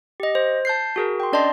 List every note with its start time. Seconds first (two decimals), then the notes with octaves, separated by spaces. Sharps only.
0.20 G4 D#5
0.35 C5
0.65 A5 G6 C7
0.96 F#4 G#4 A#4
1.20 G5 C6
1.32 C#4 D4 D5 D#5 A5 C6